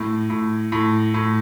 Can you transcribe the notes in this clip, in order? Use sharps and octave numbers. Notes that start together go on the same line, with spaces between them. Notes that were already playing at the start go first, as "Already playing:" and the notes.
Already playing: A2
A2
A2
A2